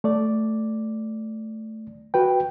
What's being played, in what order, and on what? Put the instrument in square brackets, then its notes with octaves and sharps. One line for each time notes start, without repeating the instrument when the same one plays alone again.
[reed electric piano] A3 D5
F#4 B4 G5